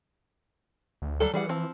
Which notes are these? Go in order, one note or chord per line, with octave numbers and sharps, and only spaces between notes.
D2
F#3 G3 A4
E3 G3 G#4 F#5
F3 C4